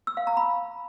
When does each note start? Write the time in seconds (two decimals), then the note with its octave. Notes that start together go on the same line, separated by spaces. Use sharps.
0.07 E6
0.17 F5
0.27 A#5
0.37 B5